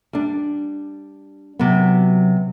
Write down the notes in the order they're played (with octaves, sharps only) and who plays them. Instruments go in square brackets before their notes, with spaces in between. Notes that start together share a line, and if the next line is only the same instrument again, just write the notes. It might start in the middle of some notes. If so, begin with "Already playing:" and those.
[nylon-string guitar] G3 D4
[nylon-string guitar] C3 B3 [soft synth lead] F#3